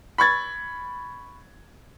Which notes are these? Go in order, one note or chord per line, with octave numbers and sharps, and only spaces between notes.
B5 C#6 G#6 A6